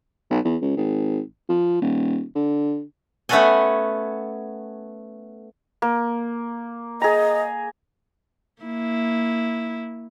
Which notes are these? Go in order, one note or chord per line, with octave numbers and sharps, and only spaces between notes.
B1
E2
C#2
G#1
F3
D#1
D3
A3 B3 C#4 F#4 A4 G#5
A#3
G#4 D#5 A#5
A#3 E4